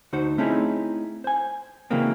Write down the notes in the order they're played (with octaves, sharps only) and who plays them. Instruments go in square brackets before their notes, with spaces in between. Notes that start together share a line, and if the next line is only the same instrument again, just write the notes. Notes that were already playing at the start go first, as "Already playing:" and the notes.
[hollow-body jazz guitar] D2 D#4 F#4 C5
A3 C4 C#4 D#4 E4 G#4
C5 G#5
C#3 E3 F#3 G#3 A#3 C4